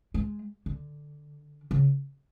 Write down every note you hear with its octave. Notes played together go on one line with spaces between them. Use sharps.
G#3
D3
C#3